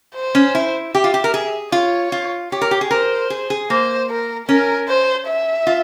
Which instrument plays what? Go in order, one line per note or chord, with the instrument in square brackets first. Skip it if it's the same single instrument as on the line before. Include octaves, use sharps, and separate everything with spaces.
[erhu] C5
[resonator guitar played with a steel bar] C#4
E4
[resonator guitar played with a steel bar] G4 [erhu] E5
[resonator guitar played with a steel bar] F4
G4
A#4
G#4
[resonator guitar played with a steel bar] F4 [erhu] C#5
[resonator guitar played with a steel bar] F4
[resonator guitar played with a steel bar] G4 [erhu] C#5
[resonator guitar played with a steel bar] A#4
G4
G#4
[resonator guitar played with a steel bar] A#4 [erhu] C5
[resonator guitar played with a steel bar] G#4
G#4
[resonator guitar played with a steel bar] A#3 [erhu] C5
[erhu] A#4
[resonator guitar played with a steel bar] C#4 [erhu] A#4
[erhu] C5
E5
[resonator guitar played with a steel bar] F4